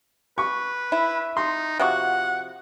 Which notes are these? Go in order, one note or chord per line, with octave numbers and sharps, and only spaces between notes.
B4 C#6
E4
D#4 C6
C3 F3 F#4 F#5